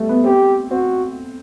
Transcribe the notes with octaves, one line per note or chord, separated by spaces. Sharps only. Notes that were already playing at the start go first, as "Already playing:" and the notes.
Already playing: G3 A3
B3
C4 G4
C4 F#4